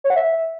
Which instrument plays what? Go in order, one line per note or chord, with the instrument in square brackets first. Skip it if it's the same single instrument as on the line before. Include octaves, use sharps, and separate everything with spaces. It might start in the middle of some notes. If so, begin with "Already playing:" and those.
[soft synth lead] C#5
F#5
E5